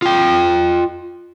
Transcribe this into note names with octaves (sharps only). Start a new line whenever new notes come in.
F4 G5